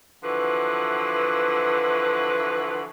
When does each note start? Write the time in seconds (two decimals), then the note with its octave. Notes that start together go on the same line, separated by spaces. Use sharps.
0.23 D3 E3 F3 F#4 B4